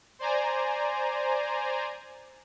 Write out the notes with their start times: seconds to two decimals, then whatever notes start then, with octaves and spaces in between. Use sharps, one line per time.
0.19 C5 D5 G#5 A#5